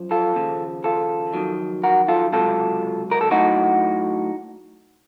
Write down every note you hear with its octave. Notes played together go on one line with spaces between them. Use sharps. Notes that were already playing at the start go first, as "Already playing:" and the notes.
Already playing: F#2 F3
F4 A4
D#2 C#3 F3
F4 A4
F2 D#3 F#3
F#4 A#4
F4 A4
C#2 C3 F#3 F4 A4
A#4
A4
A2 F#3 D#4 F#4